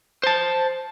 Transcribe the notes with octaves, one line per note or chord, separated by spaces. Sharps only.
C5 A5